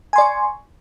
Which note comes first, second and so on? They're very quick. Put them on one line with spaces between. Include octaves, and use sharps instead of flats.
G#5 C6 D5 C#6